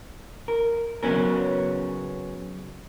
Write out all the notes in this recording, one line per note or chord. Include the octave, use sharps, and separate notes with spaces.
A#4
C#3 F#3 B3 C#4 A#4